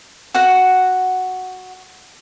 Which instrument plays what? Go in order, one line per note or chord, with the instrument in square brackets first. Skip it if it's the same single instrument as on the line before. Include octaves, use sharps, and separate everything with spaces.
[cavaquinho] F#4 F#5